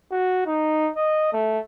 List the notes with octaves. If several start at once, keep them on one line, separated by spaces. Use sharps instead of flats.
F#4
D#4
D#5
A3